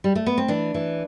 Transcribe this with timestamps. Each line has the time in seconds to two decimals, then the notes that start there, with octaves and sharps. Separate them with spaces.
0.04 G3
0.16 A3
0.26 B3
0.38 C4
0.48 E3 D4
0.74 E3